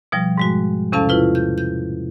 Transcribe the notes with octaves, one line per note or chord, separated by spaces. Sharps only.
B2 F3 G3
G#2 G#3 F#4
E2 C3 C#4 A4 F5 A5
E4 F4 B4
G6
G6